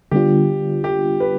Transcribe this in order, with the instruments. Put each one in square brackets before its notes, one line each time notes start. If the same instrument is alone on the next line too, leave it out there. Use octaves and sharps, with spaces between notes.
[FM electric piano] D3 G3 B3 D4 F4 [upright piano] G4
[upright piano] G4
B4